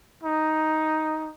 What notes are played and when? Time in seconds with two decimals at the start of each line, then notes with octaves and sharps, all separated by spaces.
0.23 D#4